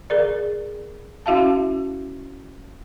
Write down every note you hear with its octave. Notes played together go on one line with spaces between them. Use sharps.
G#4 A#4 D5
C#4 E4 F#4 E5 F5 A5